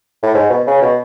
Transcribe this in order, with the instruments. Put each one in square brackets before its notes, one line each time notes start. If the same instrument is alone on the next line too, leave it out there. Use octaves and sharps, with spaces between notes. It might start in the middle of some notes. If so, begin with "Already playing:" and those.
[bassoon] A2
G#2
B2
C#3
B2